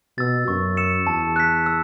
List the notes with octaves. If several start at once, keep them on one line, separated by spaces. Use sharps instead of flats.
B2 E6 A6
F#2 C#6
E6 C#7 E7
E2 A5
F#6 B6
E6